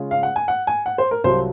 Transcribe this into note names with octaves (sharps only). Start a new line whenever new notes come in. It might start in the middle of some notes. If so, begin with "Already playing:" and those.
Already playing: C#3 G#3 C#4 F4
F5
F#5
G#5
F#5
G#5
F#5
C5
A#4
C2 C3 F#3 C4 F4 C5